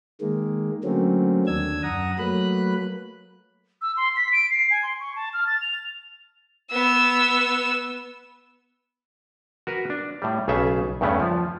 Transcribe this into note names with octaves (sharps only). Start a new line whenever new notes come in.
D#3 G#3 A#3
D3 F#3 A3 A#3 C4 C#4
D#2 D3 D4 E6 G#6
F#2 F#5 A#5 D#6
F#3 A3 A#3 B4 B5 F#6
E6
C6
B6
D7
C7
G#5
C6
C#6
A5
F6
A6
F7
B3 E6
F#4 A#4 B4
D4
A2 G3
B1 C#3 G#4 A4 E5
E2 G2 C#3 A3 B3 C#4
F3